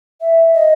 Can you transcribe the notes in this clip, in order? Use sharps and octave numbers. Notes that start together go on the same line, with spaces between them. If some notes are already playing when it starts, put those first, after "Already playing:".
E5
D#5